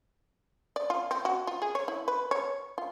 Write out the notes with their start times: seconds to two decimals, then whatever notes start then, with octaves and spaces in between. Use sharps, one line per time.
0.76 D5
0.90 F4
1.11 C4
1.25 F#4
1.47 F4
1.62 G#4
1.75 C#5
1.88 E4
2.08 B4
2.31 C#5
2.78 F4